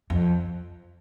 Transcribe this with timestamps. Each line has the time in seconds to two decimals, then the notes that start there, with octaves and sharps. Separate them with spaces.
0.10 F2